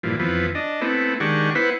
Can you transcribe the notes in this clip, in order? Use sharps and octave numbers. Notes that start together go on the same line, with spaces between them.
G2 A#2 E3 F3
F2 E3 F3 B3
D4 D#5
A3 B3 C4 E4
D#3 G#3 D4 G4 F#5 C#6
B3 E4 B4 C5 F#5